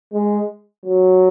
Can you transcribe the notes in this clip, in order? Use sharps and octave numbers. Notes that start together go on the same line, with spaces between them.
G#3
F#3